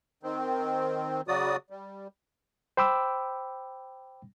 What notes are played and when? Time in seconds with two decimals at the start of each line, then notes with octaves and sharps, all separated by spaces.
0.23 D#3 C4
1.28 C#3 F#3 F#4 D5 D#6
1.70 G3
2.77 C5 G5 B5 D6 E6